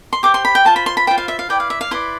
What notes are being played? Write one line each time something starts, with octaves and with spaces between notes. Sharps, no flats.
C6
G4 C5 D6
C6
B5
G5
F4 C5 A5
B5
C6
B5
F4 C5 G5
F5
E5
F5
E4 B4 D5 G5
F5
E5
F5
E4 B4 D5 C6